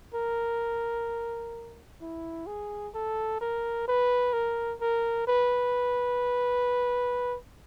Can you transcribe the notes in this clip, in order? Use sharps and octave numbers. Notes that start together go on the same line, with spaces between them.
A#4
E4
G#4
A4
A#4
B4
A#4
A#4
B4